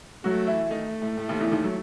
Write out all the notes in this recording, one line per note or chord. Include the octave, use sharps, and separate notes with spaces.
F#3 A3 F#4
E3 E4
D#3 A3 D#4
A2
A2
D#2 D#3
E2 E3
D#2 D#3
F#3